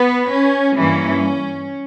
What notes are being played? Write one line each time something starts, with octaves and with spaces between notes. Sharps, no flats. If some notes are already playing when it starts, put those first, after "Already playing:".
Already playing: B3 B4
C#4
G2 E3 A#3 C#4